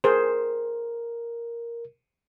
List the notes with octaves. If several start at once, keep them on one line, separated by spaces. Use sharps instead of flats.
G#4 A#4 C5